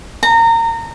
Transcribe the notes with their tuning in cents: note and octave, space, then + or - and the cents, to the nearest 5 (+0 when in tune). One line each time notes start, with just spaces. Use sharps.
A#5 -25